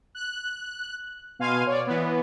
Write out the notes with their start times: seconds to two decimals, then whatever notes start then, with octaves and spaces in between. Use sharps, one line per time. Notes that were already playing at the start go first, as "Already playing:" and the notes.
0.15 F#6
1.39 B2 F5 G#5 C6 D#7
1.67 C#5 D5
1.87 E3 B3